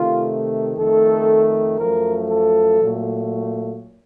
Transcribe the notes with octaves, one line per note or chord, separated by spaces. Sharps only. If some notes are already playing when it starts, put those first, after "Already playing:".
Already playing: C3 D#3 A3 F4
F2 D#3 A3 A4
F#2 F3 A3 A#4
A4
A#2 F#3 A3